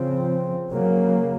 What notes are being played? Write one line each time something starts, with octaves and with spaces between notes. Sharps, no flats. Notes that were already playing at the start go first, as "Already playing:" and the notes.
Already playing: C#3 F3 C4
C#3 F#3 A#3